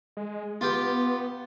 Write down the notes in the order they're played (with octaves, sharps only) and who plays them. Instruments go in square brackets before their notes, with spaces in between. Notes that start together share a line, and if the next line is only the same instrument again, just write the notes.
[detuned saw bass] G#3
[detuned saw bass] B3 [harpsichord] F4 G4